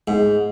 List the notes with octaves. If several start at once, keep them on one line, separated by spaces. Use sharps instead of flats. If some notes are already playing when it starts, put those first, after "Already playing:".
G#2